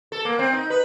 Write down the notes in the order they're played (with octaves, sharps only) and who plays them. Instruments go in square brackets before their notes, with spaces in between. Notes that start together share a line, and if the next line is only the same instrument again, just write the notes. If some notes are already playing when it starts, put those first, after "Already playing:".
[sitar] A4
A#3
C4
D#4
B4